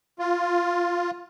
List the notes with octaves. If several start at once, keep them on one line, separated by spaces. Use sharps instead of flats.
F4